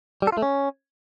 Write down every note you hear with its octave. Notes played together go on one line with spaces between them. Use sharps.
G3
A4
F4
A3
C#4